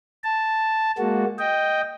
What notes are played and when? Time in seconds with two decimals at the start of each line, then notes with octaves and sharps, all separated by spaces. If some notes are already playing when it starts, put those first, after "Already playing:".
0.24 A5
0.98 G#3 A#3 F#4
1.39 D#5 G5